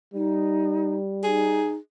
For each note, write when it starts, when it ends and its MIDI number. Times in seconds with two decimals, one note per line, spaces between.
0.14 1.73 55
0.14 0.94 63
1.24 1.73 63
1.24 1.78 68